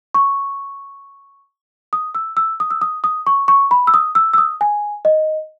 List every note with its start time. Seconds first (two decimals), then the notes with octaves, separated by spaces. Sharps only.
0.14 C#6
1.93 D#6
2.15 E6
2.37 E6
2.60 D#6
2.71 E6
2.82 D#6
3.04 D#6
3.27 C#6
3.48 C#6
3.71 B5
3.87 E6
3.94 D#6
4.15 E6
4.33 E6
4.38 D#6
4.61 G#5
5.05 D#5